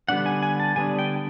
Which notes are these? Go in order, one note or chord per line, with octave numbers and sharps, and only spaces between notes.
D3 G3 B3 D4 F#5
G#5
G#5
A5
D3 G3 B3 D4 G#5
G5